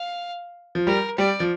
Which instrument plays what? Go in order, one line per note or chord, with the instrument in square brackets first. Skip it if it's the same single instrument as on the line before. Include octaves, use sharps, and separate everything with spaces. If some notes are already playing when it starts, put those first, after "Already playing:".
Already playing: [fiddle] F5
[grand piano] F3
[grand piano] G3 [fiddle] A#4
[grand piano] G3 [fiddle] D5
[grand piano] F3